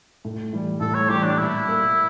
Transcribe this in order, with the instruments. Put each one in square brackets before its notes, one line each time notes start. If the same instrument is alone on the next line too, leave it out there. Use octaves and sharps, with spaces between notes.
[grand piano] A2
E3 G3
[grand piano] A2 [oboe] A4
[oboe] C#5
[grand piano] E3 G3 [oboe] G4
[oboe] D4
[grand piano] A#2 [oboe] E4
[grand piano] G3 A#3